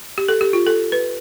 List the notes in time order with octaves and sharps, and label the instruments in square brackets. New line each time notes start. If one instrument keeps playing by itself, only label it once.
[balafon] G4
A4
G4
F4
A4
B4